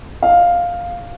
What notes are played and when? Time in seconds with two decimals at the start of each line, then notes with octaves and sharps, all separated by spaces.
0.22 F5